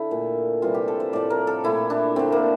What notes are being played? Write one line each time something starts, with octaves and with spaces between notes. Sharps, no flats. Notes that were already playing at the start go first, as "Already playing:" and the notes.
Already playing: D3 E4
A#2 A3
C3 E3 G3 F4
G4
A4
C5
A2 F3 A3 D5
A#4
A4
A#2 A3 E4
D4
D3 A3 C4
A#3